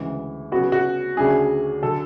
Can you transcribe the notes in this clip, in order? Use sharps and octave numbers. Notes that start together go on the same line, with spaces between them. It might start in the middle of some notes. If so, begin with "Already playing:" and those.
Already playing: D2 C#3 E3 G#3
C#3 F#3 B3 F#4
F#4
D2 C#3 F#3 A3 D4 G#4
D3 F#3 A4